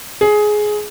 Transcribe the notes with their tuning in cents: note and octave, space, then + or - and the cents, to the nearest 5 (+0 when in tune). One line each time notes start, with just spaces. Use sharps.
G#4 +15